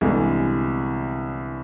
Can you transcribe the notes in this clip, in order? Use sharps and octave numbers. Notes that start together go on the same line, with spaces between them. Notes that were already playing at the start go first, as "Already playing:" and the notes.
C2 D3 E3 G#3 B3